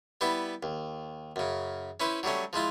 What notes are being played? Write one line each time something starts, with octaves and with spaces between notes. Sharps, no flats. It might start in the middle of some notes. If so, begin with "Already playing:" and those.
G3 B3 E4 B4
D#2
F#2 C#3
C#4 E4 B4 C5
F#3 G3 A3 C#4
F3 G#3 E4 F4